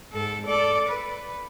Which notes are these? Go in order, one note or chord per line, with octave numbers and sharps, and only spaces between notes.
G#2 A4
A4 D5
B4